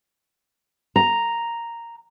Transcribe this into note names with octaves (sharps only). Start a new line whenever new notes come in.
A#5